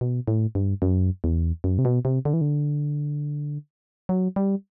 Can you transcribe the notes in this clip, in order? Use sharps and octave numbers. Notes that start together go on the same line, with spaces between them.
B2
A2
G2
F#2
E2
F#2
C3
B2
C3
D3
E3
D3
F#3
G3